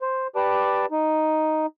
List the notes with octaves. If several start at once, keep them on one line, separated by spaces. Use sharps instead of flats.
C5
G4 B4 D5 A5 D6
D#4